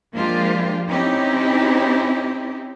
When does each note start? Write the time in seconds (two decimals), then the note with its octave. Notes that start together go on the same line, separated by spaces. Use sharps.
0.13 F3 G#3 A#3 D4 F4 G4
0.89 C4 C#4 D#4 E4 G4